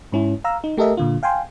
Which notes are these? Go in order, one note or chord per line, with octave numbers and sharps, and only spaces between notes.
G#2 C#4 E4
F5 A#5 E6
D#4
A3 G4 A4 A#4 D#5 E5
A#2 D3 F4
F5 G5 G#5 C6